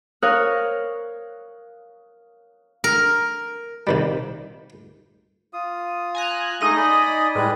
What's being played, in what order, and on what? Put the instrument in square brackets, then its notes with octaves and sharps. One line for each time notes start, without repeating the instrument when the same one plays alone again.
[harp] A#4 C#5 F5 C#6 D#6 F#6
[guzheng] A#4
[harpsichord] C3 D#3 G3
[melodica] F4 D#6
[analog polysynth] G#5 A#5 F#6
[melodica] G#3 A3 G#4 [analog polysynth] D#4 D#5 A#6
[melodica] D5 G#5 B5
[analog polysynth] A2 [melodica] G3 G#3 B4